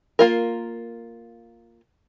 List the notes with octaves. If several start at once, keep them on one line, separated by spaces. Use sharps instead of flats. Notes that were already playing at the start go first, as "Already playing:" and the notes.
A#3 F4 A#4